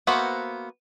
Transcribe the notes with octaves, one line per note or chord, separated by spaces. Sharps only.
A#3 B3 F#4 C5 E5